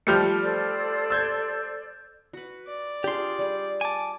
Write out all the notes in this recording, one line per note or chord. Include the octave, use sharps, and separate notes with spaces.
F3 G3 A3 F6 G6 C#7
A4 C5 D5
E6 G6 G#6
F#4 B4
D5
D4 F4 G4 G#4 C6
G3 G#4
G#5 A5 D6